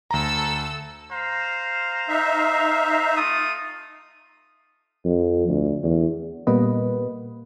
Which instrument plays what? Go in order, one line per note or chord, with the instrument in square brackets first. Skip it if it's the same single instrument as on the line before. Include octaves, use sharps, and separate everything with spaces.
[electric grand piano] D2 A#5 [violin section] A4 E6
[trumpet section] C5 F5 A#5
[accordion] D#4 E5
[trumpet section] A3 F4 D#6
[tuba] F2
D2
E2
[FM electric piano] A#2 G3 A#3 B3 B4 D#5